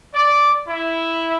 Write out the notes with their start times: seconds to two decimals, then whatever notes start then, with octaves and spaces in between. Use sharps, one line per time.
0.14 D5
0.68 E4